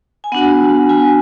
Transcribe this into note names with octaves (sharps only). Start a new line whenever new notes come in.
G#5
B3 D4 F#4 F#5
G#5